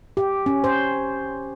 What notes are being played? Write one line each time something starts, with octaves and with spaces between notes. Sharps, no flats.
G4
C#4
C5